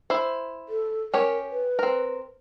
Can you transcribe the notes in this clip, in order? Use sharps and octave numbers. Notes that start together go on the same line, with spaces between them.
E4 C5
A4
C#4 G4 A#4 C#5
B4
C4 A#4